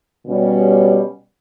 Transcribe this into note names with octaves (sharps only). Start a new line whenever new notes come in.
B2 G3 C#4